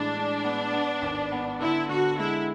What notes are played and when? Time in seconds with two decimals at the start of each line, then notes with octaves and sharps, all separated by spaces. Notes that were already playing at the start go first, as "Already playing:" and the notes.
Already playing: A2 E3 G#3 D4
0.15 G#3
0.44 B3
0.73 B3
1.02 G#1
1.32 B3
1.60 D3 E4
1.89 D3 F#4
2.18 G#3 E4